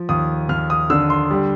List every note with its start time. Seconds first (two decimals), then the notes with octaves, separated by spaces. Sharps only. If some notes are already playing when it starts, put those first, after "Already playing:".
Already playing: F3
0.09 D#2 D#6
0.49 D#2 F6
0.70 D#6
0.90 D3 E6
1.10 C6
1.31 G3